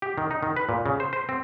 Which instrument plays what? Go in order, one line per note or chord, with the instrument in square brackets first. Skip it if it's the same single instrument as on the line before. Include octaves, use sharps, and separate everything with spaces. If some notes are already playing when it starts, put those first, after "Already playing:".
[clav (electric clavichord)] G4
D#3
D#4
D#3
B4
A#2
C#3
C5
C5
C4